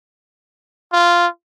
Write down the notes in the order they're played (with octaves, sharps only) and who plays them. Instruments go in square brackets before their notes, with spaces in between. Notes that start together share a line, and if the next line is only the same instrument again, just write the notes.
[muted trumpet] F4